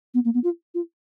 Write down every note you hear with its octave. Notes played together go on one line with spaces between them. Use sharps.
B3
A#3
B3
F4
F4